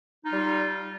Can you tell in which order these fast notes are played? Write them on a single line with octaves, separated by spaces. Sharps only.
D#4 F4 G3